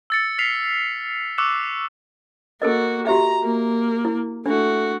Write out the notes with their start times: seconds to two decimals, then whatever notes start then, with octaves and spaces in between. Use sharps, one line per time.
0.10 E6 A6 C#7
0.38 F6 A6 B6 C7 F7
1.38 C#6 D6 E6 F#6 C#7 E7
2.62 A#3 F#4 A4 A#4 D#5
3.07 F#4 G4 E5 A#5
3.44 A#3
4.05 E4
4.46 A3 D4 F#4